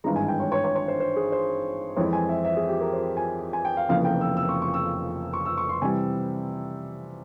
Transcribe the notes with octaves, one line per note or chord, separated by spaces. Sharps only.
G#1 G2 E3 G#3 A#5
G#5
G5
C#5
C#5
C#5
C#5
C5
C5
G#4
C5
F2 E3 G#3 C4 E4 C#5
G#5
E5
E5
G#4
G4
A#4
C5
G#5
G#5
G5
F5
F1 F2 C#3 E3 A#3 F5
G5
E6
E6
C#6
C#6
E6
C#6
E6
C#6
C6
C3 E3 G3 G#5